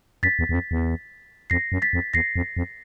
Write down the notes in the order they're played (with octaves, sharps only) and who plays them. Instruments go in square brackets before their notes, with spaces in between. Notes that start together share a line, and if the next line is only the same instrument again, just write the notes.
[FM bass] F#2 [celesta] A6 B6
[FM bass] E2
E2
F2
E2
[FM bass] F2 [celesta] A#6 C7
[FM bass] F#2
[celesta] A6 B6
[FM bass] F2
[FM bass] E2 [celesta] A#6 C7
[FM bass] F2
F2